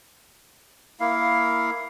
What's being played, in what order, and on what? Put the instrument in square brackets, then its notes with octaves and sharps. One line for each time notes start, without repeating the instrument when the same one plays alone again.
[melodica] A#3 E4 F5